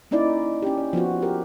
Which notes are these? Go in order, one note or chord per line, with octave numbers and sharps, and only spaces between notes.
A#3 C#4 D#4 E4 D5
C#4 G4
D5
F3 B3 F4 F#4
G4 A#4